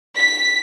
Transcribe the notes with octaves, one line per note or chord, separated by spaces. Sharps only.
B6